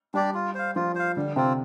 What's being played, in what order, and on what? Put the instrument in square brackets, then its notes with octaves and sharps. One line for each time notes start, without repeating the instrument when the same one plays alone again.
[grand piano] G3 [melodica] D4 G4 D5
[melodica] F4
C5 F5
[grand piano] F3 [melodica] F4
[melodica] C5 F5
[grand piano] D3 [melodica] G3
[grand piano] C3 [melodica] C4 F4